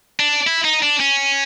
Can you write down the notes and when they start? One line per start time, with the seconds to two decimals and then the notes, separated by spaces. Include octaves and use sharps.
0.20 D4
0.47 E4
0.65 D#4
0.83 D4
1.00 C#4